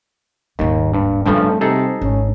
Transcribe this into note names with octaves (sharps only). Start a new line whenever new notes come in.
D#1 D#2 G#2
G2
G2 C#3 F3 G3 A3 C4
C3 D#4 G#4 A4
G#1 C#4